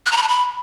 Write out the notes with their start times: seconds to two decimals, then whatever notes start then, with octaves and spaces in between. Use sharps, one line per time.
0.06 F#6
0.12 A#5
0.17 B5
0.23 A5
0.28 B5